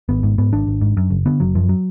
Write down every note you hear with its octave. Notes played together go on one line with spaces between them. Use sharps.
G#1 B3
G#2
G#2 B3
G#1 D4
G#1
G#2
F#2
F#1
D3 B3
F#1 F#3
F#2 F3
F#3